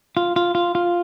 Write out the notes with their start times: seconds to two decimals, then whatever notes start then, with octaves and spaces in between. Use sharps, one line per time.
0.17 F4
0.36 F4
0.55 F4
0.75 F4